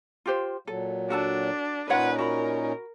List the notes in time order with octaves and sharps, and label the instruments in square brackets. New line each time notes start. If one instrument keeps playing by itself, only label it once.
[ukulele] F4 G4 C5
[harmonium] A#2 F#3 [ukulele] A4
[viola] D4 [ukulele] F#4 A4 A5
[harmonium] A#2 C#4 D#4 [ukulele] F4 C#5 F#5 [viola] B4
[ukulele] F#4 B5 [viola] A#4